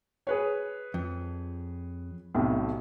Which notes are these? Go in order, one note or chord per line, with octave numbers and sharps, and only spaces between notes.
G#4 B4 C#5
F2
B1 A2 C3